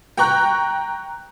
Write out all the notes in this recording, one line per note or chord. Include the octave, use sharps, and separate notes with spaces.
G5 A#5 C#6 F#6